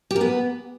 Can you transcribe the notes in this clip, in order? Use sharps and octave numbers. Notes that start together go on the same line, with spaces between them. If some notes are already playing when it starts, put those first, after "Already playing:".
G4
A#4
B3